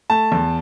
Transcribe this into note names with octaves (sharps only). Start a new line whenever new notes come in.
A3 A5
E2